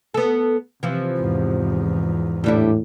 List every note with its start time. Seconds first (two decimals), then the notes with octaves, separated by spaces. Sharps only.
0.14 B3 A4
0.83 C3 E3 F3
1.18 E2 G#2
2.44 A2 G3 D4 E4